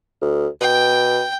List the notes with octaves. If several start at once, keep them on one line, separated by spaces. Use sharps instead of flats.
D2
B2 G5